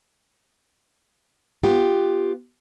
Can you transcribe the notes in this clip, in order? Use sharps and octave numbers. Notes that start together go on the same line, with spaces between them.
B3 F4 G4